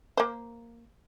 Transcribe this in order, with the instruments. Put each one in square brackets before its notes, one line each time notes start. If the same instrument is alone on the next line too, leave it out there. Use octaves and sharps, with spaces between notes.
[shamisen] A#3 C5